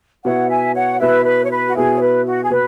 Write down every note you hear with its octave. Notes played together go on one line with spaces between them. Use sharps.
B2 B3 E4 C#5 F#5
E5 G#5
C#5 F#5
B2 B3 E4 B4 E5
B4
C#5
B4
F#4
B2 B3 E4 G#4
C#5
B4
F#4
G#4
B2 B3 B4